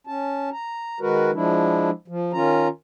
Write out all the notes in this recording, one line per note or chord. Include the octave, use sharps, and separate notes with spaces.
C#4 A5
A#5
D#3 G#3 F#4 A#4 B4
F3 G#3 D4 E4
F3
D#3 C#4 F4 A#5